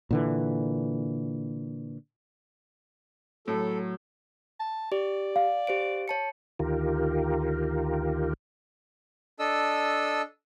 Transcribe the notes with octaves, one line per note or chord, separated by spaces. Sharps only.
A#2 D3 E3
A2 F#3 A4
A5
G4 D5
F5
G4 C5 D7
C#5 A5 C#7
D2 D#3 F4 G4 A#4
D4 A4 D#5 E6